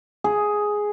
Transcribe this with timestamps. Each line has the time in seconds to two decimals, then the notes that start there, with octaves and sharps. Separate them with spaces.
0.24 G#4